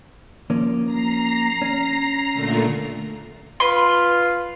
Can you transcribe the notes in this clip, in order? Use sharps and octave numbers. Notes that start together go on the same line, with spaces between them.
F3 A#3 C#4
A#5 C7
C#4
A#2 D3 A3
F4 B4 C6